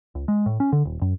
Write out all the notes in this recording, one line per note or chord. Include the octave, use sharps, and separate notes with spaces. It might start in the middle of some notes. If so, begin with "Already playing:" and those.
C#2
G#3
A2
C#4
D3
D#1
F#2